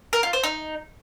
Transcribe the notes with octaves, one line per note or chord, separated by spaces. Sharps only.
A#4
F4
C5
D#4